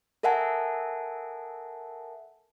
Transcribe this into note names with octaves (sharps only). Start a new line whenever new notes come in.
A4 A#4 E5 F#5 G#5 A5